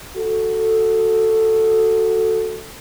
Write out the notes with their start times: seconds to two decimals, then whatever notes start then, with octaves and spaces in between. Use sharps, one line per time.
0.16 F#4 A4